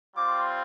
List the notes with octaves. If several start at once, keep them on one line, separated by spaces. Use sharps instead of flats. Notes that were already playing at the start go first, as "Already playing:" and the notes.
G3 C4 F4 D6